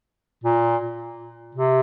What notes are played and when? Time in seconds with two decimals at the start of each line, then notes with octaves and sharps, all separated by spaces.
0.44 A#2
1.55 C3